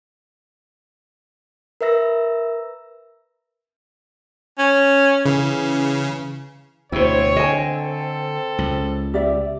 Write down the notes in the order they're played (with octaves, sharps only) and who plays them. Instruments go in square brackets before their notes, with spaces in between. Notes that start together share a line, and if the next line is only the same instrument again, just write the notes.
[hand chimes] A#4 B4 E5 E6 A#6
[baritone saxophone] C#4
[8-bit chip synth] C#3 [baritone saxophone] E3
[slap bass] D2 B2 [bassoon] C4 [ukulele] E4 C5 [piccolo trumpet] C#5
[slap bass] D3 [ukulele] D#5 G#5
[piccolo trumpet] A4
[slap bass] C#2
[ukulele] G4 D5 E5